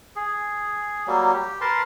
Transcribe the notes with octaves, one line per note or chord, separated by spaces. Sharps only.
G#4
F#3 G3 A#3
G4
A#4 B4 A5 C6